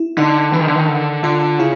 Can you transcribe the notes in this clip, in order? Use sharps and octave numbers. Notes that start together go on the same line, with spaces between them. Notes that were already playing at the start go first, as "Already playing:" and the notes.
Already playing: E4
D3 D#4
E3 D4
D#3
D3
D#3
D3
D3 F4
C#3 E4